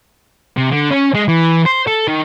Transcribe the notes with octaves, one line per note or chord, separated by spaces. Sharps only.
C3
D3
C#4
G#3
E3
C5
A4
D#3